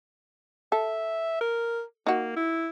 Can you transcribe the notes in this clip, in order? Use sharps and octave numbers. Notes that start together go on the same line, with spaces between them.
A4 E5
A#4
A#3 D#4 F#4
E4